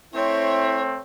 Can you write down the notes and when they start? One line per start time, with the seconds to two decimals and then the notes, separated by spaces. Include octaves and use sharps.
0.14 A3 C4 E4 C#5